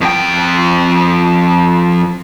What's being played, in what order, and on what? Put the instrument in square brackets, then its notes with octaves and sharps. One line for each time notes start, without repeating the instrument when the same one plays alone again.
[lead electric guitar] F2 G5